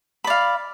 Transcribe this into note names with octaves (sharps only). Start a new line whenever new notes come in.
D5 F5 B5